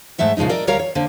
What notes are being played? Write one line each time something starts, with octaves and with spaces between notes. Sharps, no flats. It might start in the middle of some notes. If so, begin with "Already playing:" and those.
G#2 G#3 A3 E5 F#5
A#2 C#3 F3 G#3 D#4
A4 A#4 D5 D#5
D2 G3 A#4 C#5 F5 A#5
C#5
D3 A#3 C5